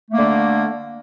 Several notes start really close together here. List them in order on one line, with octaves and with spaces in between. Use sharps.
A3 A#3 D3